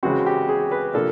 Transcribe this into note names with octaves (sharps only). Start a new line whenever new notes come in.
C#3 E3 G#3 C4 F#4
G4
G#4
B4
C3 F3 A#3 D4 A4